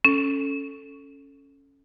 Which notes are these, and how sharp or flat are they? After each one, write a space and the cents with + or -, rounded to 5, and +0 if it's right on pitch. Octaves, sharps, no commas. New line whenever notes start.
C#4 +0 A4 +0